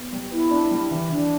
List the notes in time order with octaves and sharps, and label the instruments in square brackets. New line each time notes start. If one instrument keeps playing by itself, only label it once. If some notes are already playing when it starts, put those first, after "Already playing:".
Already playing: [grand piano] B3
G3
[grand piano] B3 [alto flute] E4
[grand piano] D4
G3
E3
[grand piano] E3 [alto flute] D4